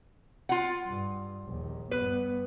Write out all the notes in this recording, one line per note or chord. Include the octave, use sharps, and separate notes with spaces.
F4 F#5
G2
A#1 D#2
G2 B3 B4